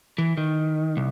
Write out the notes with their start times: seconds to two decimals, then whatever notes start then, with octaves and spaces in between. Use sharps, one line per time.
0.18 E3
0.37 D#3
0.97 C2